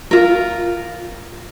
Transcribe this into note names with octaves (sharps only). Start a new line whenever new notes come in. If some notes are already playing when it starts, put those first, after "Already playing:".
F4 A#4